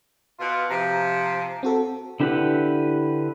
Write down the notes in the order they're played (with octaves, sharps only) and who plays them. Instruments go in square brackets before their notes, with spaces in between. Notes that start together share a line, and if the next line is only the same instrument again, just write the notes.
[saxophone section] B2 F4
[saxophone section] C3 F3 [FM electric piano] A#5
[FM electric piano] C4 F#4 A4
[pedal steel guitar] D3 E4 G4 B4 F#5